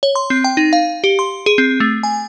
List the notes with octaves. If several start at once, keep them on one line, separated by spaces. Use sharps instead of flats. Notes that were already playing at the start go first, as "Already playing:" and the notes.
C#5
C6
C4
G5
D#4
F5
G4
C6
G#4
C4
A3
G#5